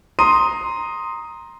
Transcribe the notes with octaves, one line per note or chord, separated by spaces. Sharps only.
A#5 C6 D#6 D#7